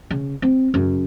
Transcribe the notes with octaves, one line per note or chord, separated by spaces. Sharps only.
C#3
C4
F#2 C#3